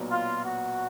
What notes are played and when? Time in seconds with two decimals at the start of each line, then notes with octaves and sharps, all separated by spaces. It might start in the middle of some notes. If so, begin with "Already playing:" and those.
Already playing: B1 A#2 F#3 B3
0.11 F4
0.44 F#4